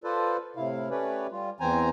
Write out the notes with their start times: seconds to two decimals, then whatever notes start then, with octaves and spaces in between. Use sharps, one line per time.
0.04 F4 A4 B4 C5 D5
0.56 A2 C3 E4 F5
0.90 A3 C#4 G4 B4 C#5 D5
1.32 G3 F4
1.60 E2 E3 C4 C5 G#5 A#5